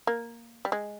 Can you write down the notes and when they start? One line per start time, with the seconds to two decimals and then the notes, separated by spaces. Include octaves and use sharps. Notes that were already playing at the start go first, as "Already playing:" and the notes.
0.07 A#3
0.65 G3
0.72 G#3